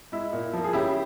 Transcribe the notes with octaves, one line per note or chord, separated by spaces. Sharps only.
G#3 E4
A#2
F3 A#3
G#4
C#3 E4 G4